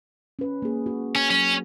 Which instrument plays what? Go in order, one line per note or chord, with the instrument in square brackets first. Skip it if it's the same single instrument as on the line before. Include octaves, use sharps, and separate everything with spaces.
[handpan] C#4 B4
A#3 G#4
F#4
[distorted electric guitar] C#4
[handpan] F#3 [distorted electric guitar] C#4